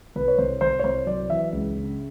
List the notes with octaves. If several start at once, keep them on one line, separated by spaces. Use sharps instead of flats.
C2 B4
C#5
C2 C5
C2 C5
C#5
C2 C5
F#3 D5
E3 E5
C#2
C#3